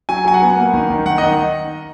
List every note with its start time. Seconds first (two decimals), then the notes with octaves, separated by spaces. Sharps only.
0.09 F#3 G#5
0.25 F#3 G#5
0.34 F#5
0.42 B3
0.57 A#3
0.74 D#3
0.90 D#3
1.06 D#3 F#5
1.18 D#5
1.22 D#3